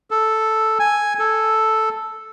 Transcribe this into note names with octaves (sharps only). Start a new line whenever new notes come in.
A4
G#5
A4